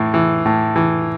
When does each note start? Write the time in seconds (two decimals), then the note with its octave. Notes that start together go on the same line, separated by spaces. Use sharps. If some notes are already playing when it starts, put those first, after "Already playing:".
Already playing: A2 E3
0.14 E3
0.45 A2
0.76 E3